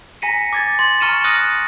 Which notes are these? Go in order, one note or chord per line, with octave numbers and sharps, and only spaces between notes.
G#5 A#5 A#6 B6 C#7 D#7
D6 G#6 A6
C6 A6
A#5 C#6 F6 C#7 D#7 E7
D#6 F6 F#6 A#6 D#7 F#7